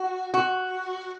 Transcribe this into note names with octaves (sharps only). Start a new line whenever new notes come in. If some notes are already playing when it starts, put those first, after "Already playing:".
Already playing: F#4
F#4